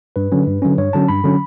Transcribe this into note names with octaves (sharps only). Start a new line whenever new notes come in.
G2 B4
D3 F#3 C#4
G2
D3 F#3 C#4
G2 C#5
D3 F#3 C#4 A5
G2 B5
D3 F#3 C#4